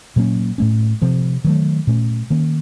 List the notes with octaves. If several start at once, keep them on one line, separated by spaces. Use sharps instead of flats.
A#2 F#3 A#3 C#4
A2 A3 C#4
C3 F3 C4
D#3 F#3 A3
A#2 A3 C#4
D#3 A#3 C#4